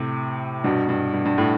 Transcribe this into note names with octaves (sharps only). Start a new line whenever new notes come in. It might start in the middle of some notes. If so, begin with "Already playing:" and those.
Already playing: A2 C3
G2 B2
G2
G2
G2
A2